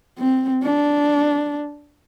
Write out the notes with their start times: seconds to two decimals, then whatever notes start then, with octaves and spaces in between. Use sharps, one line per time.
0.18 C4
0.63 D4